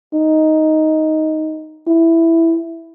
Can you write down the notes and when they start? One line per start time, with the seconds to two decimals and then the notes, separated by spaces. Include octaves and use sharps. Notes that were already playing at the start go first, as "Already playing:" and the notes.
0.14 D#4
1.87 E4